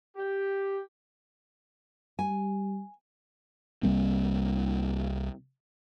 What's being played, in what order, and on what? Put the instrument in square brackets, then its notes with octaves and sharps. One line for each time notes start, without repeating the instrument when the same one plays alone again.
[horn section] G4
[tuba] G3 [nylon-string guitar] G#5
[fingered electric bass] C2 G3 A#3 C4